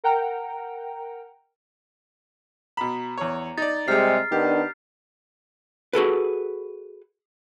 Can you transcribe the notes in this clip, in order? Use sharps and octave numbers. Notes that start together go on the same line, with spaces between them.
A#4 F#5 G5 A#5
B2 A#5 B5
E2 C#5
D#4 D5 A6
C3 G3 G#3 G4 G#4 F6 C7
D#3 B3 D4 G4
F#4 G#4 A4 B4